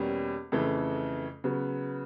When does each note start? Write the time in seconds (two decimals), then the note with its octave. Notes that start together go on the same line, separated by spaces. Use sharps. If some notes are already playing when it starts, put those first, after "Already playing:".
Already playing: E2 B2 G3 A#3 C#4
0.52 F2 C#3 E3 A3
1.44 C#3 F#3 B3